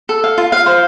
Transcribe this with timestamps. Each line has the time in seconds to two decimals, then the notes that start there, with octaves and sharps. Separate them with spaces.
0.09 A4
0.24 F5
0.38 F4
0.52 F5
0.66 C5